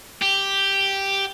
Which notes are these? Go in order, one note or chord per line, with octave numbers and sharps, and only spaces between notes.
G4